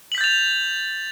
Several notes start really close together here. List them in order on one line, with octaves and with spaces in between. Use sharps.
F#7 B6 G6 A6 F7